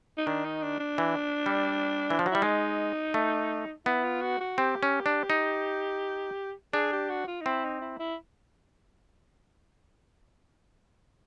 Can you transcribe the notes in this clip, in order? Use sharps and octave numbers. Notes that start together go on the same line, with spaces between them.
D#4
D#3 D4
D#4
D4
D4
E3
G3
E3
F3
F#3
G3 E4
G#3 D#4
A3
B3 E4
F4
F#4
F#4
C4 G4
C#4
D4
D#4
D4 G#4
G4
F#4
F4
D#4
C4 E4
D#4
E4
E4